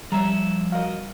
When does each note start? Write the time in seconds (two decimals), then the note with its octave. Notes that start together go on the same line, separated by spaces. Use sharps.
0.12 F3 G3 E5 A#5
0.72 F#4 A#4 D#5 F5